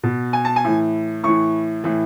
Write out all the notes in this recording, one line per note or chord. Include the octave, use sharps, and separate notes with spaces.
B2
G#5
A5
G#5
A2 E3
A2 E3 C#6
A2 E3